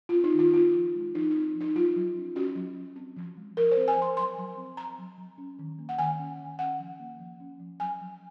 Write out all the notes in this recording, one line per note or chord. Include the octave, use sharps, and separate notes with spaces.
C4 F4
D#4
D#3 F4
C4 F4
F3
G#3
F3 D#4
D#4
C4
F3
D#4
F#3 F4
F#3
C#4
C#4 F#4
F#3
F#3
C4
F3
G#3
F3 A#4
C5
C4
G#5
F3 C6
F#3 C6
F#3
C4
C4 A#5
F#3
F#3
C#4
D#3
A#3
F#5
D#3 G#5
C#4
D#3
C#4 F#5
F3
A#3
F3
C#4
F3
F#3 G#5
F#3